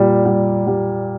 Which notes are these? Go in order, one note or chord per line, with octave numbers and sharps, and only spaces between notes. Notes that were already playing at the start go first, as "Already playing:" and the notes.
Already playing: A#2 G3
G3
G3